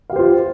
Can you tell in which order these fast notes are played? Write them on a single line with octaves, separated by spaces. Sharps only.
F5 G4 C5 F4